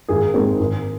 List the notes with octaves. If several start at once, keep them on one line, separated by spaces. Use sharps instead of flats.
G#1 G#4
G#2 G#3 C4
G#1